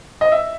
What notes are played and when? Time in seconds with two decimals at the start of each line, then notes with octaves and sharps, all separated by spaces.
0.21 D#5
0.32 E5